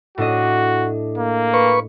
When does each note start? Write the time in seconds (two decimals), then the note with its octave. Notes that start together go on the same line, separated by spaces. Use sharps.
0.18 A2 D4 F#4 D#5
1.18 A#3
1.54 B4 C#6